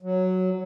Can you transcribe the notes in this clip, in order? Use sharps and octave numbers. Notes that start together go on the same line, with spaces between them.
F#3